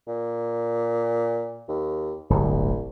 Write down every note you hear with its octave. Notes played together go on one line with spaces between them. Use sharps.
A#2
D#2
D1 G1 C2